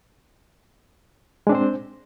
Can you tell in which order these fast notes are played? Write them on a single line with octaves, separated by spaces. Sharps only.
G#3 D4 C4 C5